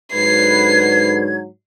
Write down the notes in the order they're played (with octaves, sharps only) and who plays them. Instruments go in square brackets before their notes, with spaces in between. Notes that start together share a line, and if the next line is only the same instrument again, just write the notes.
[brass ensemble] G#2 D3 F#3 [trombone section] B4 [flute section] G#6 [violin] C7